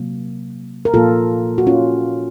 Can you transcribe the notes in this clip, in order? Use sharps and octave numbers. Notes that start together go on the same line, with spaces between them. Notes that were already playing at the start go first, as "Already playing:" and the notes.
Already playing: C3 F#3 A#3
A#4
A#2 F3 A#3 F4 A4
F#4
C#4 F4